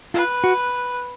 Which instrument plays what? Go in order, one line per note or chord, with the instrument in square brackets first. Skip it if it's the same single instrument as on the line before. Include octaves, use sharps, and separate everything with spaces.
[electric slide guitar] F4 [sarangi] B4
[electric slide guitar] F#4